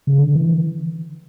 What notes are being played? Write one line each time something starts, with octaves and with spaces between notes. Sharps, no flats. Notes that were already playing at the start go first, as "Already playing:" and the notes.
C#3
D3
E3